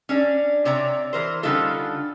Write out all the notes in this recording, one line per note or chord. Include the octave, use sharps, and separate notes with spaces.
C#4 D4 D5
C3 C#5 D5 A#5
E3 A#4 C5
D3 G3 C#4 D#4 F4 A4